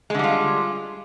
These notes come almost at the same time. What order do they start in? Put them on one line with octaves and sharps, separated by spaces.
G#3 D3 G3 F4